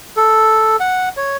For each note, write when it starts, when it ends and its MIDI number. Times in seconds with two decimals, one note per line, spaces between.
0.17 0.76 69
0.80 1.09 78
1.17 1.37 73